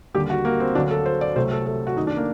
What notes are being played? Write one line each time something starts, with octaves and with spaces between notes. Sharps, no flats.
D#2 D3 G3 G4
F#4
A#3
C4
D2 D3 F#3 A#3 D4
A4
C5
D5
C2 C3 F#3 A3 C5
A4
A4
F#4
F#2 D#3 A3 D#4
D4
A#3